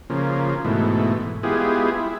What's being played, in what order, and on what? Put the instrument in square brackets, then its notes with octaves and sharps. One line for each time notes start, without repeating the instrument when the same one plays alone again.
[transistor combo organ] C#3 F3 A#3
G#2 B2 E3 A3
G#3 B3 E4 F4 G4 G#4
E4